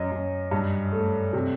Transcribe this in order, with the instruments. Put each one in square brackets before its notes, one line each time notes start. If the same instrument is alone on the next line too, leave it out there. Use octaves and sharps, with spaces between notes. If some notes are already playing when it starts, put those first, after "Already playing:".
Already playing: [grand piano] F#2 D#5
F#2
G2
A3
C3